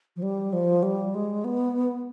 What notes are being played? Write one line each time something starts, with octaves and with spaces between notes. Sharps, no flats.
F3
G3
F3
G3
G#3
B3